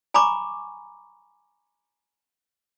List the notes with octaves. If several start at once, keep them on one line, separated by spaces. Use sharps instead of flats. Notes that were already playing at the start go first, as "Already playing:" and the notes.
G#5 A#5 B5 C#6 D6